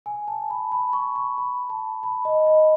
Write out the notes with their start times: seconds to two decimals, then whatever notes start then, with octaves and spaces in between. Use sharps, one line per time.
0.06 G#5
0.28 A5
0.50 B5
0.72 B5
0.93 C#6
1.16 C#6
1.38 B5
1.70 A5
2.03 B5
2.25 D#5
2.47 D#5